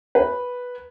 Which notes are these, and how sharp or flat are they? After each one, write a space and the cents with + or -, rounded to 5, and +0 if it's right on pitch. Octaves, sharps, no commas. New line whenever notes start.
B4 -5